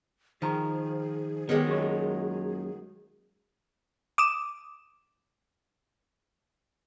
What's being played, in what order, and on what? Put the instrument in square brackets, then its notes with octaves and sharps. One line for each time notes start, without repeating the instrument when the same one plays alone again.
[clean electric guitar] D#3 A#5 [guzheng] F3 [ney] G#4
[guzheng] D#3 F#3 G#3 [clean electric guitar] B3 G4
[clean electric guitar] F#2 A#2 C#5
[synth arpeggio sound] D6 D#6 E7